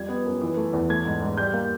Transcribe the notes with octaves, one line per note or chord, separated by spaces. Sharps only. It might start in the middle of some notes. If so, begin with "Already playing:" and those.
Already playing: F2 G3 G#6
B3
F#2
E3
A3
E2
A3 G#6
G#2
G#2
G3 G6
A#3